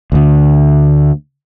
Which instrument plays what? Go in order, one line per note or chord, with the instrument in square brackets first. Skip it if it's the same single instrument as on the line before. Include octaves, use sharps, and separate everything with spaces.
[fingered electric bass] D2 D3